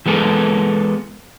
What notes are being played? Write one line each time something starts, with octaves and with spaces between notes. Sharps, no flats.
E3 G#3 B3 A4 A#4